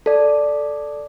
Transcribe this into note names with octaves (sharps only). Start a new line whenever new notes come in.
A4 D5